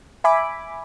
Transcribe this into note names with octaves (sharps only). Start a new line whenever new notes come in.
E5 G#5 B5 D6